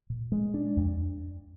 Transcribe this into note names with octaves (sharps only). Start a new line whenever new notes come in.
A#2
G#3
D4
F2